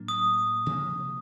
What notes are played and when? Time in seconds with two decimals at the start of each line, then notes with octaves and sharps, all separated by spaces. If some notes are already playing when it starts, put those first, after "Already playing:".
Already playing: A2 F#3 A#3 D4
0.08 D#6
0.66 C3 F3 A#3